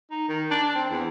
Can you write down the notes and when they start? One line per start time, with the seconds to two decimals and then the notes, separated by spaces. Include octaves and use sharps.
0.11 D#4
0.29 D#3
0.51 D4
0.63 D4
0.75 C4
0.90 E2